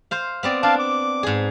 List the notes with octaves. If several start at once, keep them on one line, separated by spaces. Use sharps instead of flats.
C5 F5
B3 C4 D5
D4 F5 A5
D6
G#2 G#4